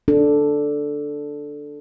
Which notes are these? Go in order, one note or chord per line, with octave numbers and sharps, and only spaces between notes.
D4 A4